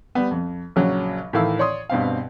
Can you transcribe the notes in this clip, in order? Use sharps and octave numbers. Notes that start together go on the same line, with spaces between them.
G3 B3
F2
A#1 C#3 F#3
A2 D#3 E3 E4 F5 E6
C#5 D5 C6 D#6
G2 B2 C4 F5